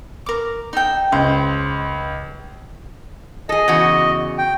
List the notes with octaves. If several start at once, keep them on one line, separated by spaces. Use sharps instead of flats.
A#4 D6
D#4 A4 G5
C#2 C5
G#4 A4 D#5
E2 C#3 F#4
G5